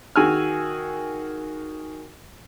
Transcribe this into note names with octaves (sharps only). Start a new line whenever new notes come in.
D#3 F#4 G#4 G#5 E6 F6